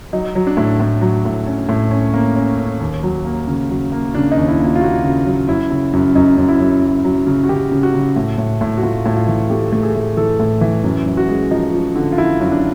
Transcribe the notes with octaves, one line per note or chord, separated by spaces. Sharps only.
F#3 D#4
F#3
D4
A2
A2
F#3
A2
C#4
A2
C#4
A#3 C#4
C#4
C#4
D#2
F#3
A#3
C#3
F#3
A#3
C#3 D4
D#4
D#2
E4
A#3
F4
F4
A#3 F#4
C#3
F#3
F#2 E4
C#3
F#2
F#2 D#4
F#2
E4
F#2
F#2
F#3
C#3
F#4
C#3 G4
C#3
F#4
C#3
A2
A2
A2
F#4
A2 F4
A2
F4
E3
A3 G4
A3
G#4
A2
E3 A4
A2
E3
F#2
F#2
F#4
G#3
F3 D#4
F3
D3
F4
F3 E4
F#2
D4